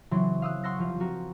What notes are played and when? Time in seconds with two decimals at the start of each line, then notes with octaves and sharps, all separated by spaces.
0.11 C#3 E3 F#3 C4 C#4 C6
0.42 F5 D#6 E6 F#6
0.64 F#5 C6 C#6 E6 F#6 A#6
0.78 F1 F3 F5
1.00 F3 C4 F#4 A#4